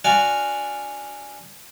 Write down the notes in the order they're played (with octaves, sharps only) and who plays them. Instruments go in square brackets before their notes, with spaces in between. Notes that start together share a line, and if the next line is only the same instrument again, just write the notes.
[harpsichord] D4 F#4 D5 F5 G#5